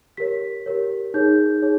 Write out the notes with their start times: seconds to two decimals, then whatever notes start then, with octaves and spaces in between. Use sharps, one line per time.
0.17 G4 A#4 C#5 B6
0.66 G4 A#4 C#5
1.14 D#4 G#4 C#5 G6
1.62 D#4 G#4 C#5